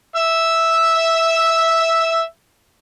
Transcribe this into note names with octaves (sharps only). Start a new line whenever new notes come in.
E5 E6